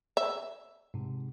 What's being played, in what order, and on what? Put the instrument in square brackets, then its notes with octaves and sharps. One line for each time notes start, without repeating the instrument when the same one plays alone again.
[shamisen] E5
[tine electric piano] G#2 C3